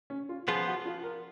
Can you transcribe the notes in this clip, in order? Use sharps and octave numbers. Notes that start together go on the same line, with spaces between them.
C#4
F4
F3 B3 F4 G#4
F#4
F4
A#4